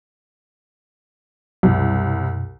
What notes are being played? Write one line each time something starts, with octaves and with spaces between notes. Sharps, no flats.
C2 F#2 B2